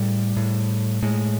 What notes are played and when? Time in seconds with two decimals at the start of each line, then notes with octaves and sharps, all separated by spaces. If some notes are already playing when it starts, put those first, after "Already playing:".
Already playing: A2 G3
0.36 A2
1.02 A2 G#3